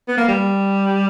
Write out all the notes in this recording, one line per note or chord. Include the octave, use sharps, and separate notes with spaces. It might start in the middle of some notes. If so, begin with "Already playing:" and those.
B3
A#3
G3